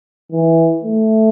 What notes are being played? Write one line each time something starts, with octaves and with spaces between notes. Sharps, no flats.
E3
A3